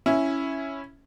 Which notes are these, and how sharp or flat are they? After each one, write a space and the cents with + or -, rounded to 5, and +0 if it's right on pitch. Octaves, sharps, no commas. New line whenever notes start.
C#4 +0 E4 +0